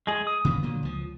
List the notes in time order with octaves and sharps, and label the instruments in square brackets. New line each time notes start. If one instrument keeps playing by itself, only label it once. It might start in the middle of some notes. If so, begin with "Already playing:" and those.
[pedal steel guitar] G#3 G#4
D#6
[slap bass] C#3 F3 B3
A#2 D3 F#3
C#2 F3